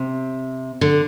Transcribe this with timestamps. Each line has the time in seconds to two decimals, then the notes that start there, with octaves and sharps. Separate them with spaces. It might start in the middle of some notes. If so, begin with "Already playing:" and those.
Already playing: C3
0.81 D3